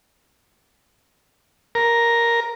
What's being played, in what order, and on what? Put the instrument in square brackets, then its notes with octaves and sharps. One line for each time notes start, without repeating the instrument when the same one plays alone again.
[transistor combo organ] A#4